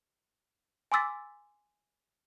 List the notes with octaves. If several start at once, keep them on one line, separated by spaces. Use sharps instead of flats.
G#5 C6 D6 E6 A6 B6